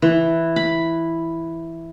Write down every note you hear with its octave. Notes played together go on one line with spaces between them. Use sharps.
E3
B5